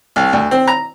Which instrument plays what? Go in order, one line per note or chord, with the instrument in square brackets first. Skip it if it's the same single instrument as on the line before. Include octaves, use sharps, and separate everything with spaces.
[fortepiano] C2
D2
C4
A#5